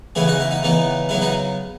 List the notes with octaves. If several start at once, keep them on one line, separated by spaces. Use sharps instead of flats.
C#3 E3 B3 E4 G#4
D#4 F#4
E4
D#4
C#3 E3 B3 D#4
C#3 F#3 B3 E4
D#4 F#4